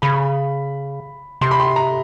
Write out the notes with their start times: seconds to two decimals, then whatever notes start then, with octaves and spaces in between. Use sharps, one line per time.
0.02 C#3 B5
1.41 C3 C6
1.51 B5
1.60 C6
1.76 A#5